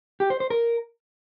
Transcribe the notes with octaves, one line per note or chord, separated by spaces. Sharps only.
G4
C5
C5
A#4